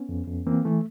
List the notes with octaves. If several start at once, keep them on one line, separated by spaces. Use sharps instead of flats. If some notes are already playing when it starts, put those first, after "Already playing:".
Already playing: B3 C#4
F2
F2
E3 A#3 C4
E3 A3